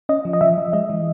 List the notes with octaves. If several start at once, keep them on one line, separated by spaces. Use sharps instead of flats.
C#4 D#5
F3
D#5
F3 E5
F3
G#3 D#5
E3